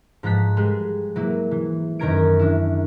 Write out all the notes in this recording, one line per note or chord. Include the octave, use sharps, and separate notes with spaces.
G#2 F3 A#5 F#6 B6
G3 G#3 G#4
F#3 A#3 E4
E3
F#2 D#3 A#4 A#5 G#6 D7
D4 E4